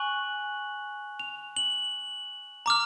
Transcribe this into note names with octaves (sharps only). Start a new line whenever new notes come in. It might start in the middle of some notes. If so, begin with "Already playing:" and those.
Already playing: G#5 C#6 F#6 F#7
F7
F#7
A#5 D6 F6